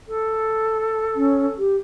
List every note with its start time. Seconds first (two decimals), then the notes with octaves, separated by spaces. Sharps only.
0.07 A4
1.16 C#4
1.58 G4